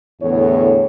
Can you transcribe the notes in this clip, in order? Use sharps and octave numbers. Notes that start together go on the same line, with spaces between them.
E2 A2 D3 C#5